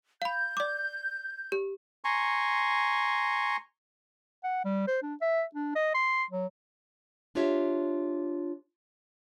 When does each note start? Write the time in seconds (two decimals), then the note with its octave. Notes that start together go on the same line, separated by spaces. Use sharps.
0.22 F5 B5 G6
0.57 D5 D6
1.52 G4
2.04 G#5 A#5 C6 C#6
4.44 F#5
4.65 G3
4.87 C5
5.03 D4
5.21 E5
5.55 D4
5.76 D#5
5.94 C6
6.31 F#3
7.35 D4 F4 G4 C#5 E5